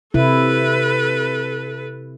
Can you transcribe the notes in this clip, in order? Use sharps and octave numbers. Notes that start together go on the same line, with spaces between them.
C3 E4 A4 B4